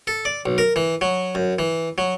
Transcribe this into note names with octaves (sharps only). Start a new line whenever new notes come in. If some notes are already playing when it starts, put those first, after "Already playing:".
A4
D5
B1
A#4
E3
F#3
F#2
E3
F#3